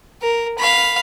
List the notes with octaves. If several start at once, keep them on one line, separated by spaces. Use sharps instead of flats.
A#4
F5 B5